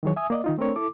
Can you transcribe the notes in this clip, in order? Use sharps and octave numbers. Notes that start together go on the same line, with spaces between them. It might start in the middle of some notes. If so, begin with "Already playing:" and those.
D#3 E3 F#3 G#4 C#5
E5 G#5 D#6
A#3 D5 D#5
D#3 D#4 F4
A3 C4 D4 A#4 C#5
E4 A4 D6